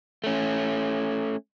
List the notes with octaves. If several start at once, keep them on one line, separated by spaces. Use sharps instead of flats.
A3 C#4